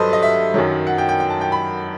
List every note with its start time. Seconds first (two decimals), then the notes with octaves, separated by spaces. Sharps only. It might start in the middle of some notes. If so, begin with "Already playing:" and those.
Already playing: G2 F#3 A4 B4 C5 D#5
0.13 D#5
0.23 E5
0.54 F#2 D#3 F#3
0.87 F#5
0.98 G5
1.09 G5
1.20 G5
1.30 A5
1.41 G5
1.52 B5